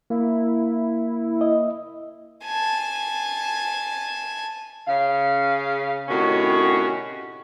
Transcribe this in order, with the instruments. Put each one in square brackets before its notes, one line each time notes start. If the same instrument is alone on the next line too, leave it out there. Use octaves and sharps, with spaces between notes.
[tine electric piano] A#3 [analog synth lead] E4
[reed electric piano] D#5
[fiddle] G#5 A5
[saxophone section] C#3 F5
A2 C3 D#3 C#4 D#4 F#4